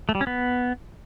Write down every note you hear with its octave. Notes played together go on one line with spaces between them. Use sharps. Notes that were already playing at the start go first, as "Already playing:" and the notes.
A3
G3
C#4
B3